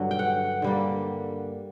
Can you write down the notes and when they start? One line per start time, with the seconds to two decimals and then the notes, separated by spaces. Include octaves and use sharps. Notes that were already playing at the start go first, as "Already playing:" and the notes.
Already playing: G2 D3 F#3
0.11 G5
0.19 F#5
0.62 D3 G3 A#3